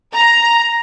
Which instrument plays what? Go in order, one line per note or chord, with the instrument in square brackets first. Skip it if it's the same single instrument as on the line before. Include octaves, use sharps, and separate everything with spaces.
[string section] A#5